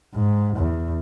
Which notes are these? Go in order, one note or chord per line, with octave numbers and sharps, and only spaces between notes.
G#2
E2